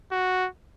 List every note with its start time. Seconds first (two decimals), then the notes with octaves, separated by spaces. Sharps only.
0.12 F#4